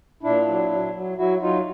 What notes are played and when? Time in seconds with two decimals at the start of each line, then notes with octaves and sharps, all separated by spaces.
0.23 A#2 D4 E4
0.48 F#3
0.71 F#3
0.95 F#3
1.17 F#3 E4 F#4
1.41 F#3 D#4 F4